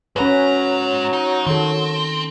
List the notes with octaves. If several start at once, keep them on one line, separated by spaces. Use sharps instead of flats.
G#2 F#3 C#4 B4 A#5
D#4
D#3 C4 A4